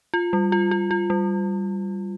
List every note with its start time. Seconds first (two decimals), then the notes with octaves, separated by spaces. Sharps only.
0.14 F4
0.33 G3
0.52 F4
0.71 F4
0.91 F4
1.10 G3